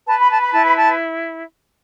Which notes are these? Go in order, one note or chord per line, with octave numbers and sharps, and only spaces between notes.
B4 A5
B5
A5
B5
E4 A5
B5
A5